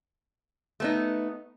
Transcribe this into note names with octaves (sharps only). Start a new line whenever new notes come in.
A3 B3 D#4